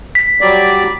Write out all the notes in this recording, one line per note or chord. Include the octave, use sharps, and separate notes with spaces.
B6
F#3 G3 D5